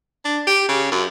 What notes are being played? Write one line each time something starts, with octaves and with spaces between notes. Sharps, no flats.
D4
G4
C#3
F#2